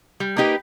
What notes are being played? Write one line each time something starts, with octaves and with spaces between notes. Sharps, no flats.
G3
A#3 D#4 G4 B4